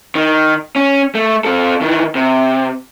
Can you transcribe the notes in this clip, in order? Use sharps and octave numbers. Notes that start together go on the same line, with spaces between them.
D#3
C#4
A3
C4 A4
D#3 E3
C3